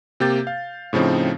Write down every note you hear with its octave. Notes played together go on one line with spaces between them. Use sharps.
C3 A#3 G4 G6 A6
F5
A2 C#3 F3 C4 D#4